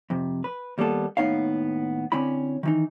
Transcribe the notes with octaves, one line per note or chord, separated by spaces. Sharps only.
F2 C3
B4
D#2 G3 A#3 B3 A4
D#2 A2 B3 D#4 C#5 F5
D3 C4 C#4 E4 B5
D#3 E3 D#4